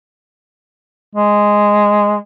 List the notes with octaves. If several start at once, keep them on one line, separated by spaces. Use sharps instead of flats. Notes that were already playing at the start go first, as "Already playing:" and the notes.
G#3